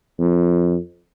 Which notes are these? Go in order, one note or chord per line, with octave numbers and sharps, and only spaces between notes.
F2